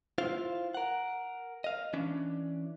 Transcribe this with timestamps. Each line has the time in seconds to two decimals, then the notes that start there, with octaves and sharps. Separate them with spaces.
0.18 E4 F4 C5 F5
0.74 A#4 F#5
1.64 D#5 F5
1.93 E3 C#4 D4